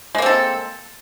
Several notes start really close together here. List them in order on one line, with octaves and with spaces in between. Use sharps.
G#3 A#3 C4 A4